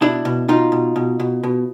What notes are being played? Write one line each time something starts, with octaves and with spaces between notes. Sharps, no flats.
B2 D4 E4
B2
B2 D#4 F4
B2
B2
B2
B2